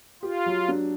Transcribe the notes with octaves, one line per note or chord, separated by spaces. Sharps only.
F4 G4
F#3
D4